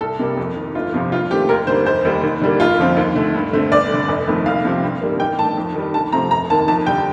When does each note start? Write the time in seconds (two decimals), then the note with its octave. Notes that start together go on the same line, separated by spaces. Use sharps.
0.01 C2 A4
0.19 C3 G3 A#3
0.37 F2
0.56 D#3 A#3
0.75 G1 F4
0.94 F2 C3 F3
1.12 G2 F4
1.31 D#3 A3 C4 G4
1.49 D#2 A#4
1.67 D3 G3 A#3 C5
1.86 F1 C5
2.05 D#2 D#3 G3
2.23 D#2
2.41 D3 G3 A#3
2.60 F1 F4
2.78 F2 D3 F3 C4
2.97 D#2
3.15 D3 A3
3.35 G2
3.53 D3 A3 C4
3.72 G1 D5
3.90 G2 D3
4.08 F1
4.27 F2 D#3 A3 C4
4.46 C2 F5
4.64 C3 F3 C4
4.82 G2
5.01 D#3 G3 A#3
5.20 A1 G5
5.39 G2 D#3 A3 A5
5.57 F2
5.75 D#3 G3
5.94 D2 A5
6.12 C3 F3 A3 C4 A#5
6.31 F1 A#5
6.50 D#2 D#3 A#3 A5
6.68 F2 A5
6.86 D3 G3 G5